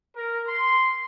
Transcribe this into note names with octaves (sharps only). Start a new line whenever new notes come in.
A#4
C6